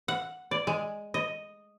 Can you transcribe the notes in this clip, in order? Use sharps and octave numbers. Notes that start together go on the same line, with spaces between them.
F#5
D5
G#3
D#5